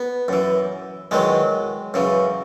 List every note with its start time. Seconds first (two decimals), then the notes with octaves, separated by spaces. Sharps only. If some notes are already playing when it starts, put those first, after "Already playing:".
Already playing: B3
0.28 F#2 E3
1.11 E2 D#3 F#3 G#3
1.94 F#2 C#3 E3